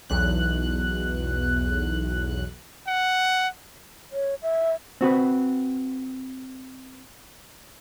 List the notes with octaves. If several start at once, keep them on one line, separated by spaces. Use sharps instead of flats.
B1 E2 F#6
F#5
C#5
E5
C4 F#4 B4